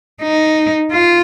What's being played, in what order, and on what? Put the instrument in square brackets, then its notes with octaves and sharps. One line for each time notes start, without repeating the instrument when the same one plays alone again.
[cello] D#4
F4